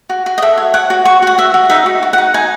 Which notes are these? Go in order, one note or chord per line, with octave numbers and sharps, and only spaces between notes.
F#4
F#4
D#5
A4 E5
C#5
C#5 F#5
F#4
F#4 C#6
F#4 F#5
F#4 E5
F#4
D#4 E5
F#4
F#4
F#5
D#4
D#4 G#5